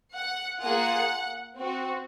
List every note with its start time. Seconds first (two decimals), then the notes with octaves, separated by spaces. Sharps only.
0.14 F#5
0.61 A#3 F4 G#4 F#5
1.57 C4 F#4